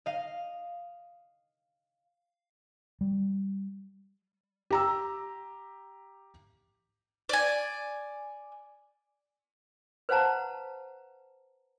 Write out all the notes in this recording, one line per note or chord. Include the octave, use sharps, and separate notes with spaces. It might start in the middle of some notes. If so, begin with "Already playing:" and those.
D#5 F5
G3
G4 A#5 E6
D5 G#5
B4 C5 F5 F#5 A5 A#5